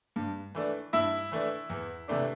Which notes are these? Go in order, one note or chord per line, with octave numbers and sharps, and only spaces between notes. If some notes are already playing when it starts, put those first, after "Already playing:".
G2
E3 A3 D4
G2 E4 E5
E3 A3 D4
E2
C3 E3 A3 D4